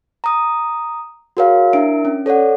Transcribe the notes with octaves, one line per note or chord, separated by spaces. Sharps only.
A#5 D#6
F#4 G#4 A#4 C#5 F5
D4 E4 A#4 E5 D7
C#4
A4 C#5 D5 F#5